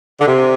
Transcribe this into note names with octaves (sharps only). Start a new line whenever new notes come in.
D3
C3